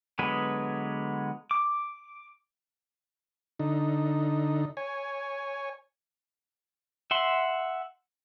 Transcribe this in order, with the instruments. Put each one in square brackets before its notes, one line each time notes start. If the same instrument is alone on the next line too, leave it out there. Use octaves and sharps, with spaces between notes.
[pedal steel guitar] D3 F#3 G#3 B3 B4
D6
[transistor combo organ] D3 D#4
C#5 G#5
[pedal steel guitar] E5 F#5 C6